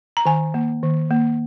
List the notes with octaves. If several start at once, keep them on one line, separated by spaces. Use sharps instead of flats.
A#5
D#3 G#5
A#3
D#3
A#3